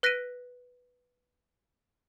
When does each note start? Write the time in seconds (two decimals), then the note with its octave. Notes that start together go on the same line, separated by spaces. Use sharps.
0.03 B4 F#6 A#6 B6 D7 D#7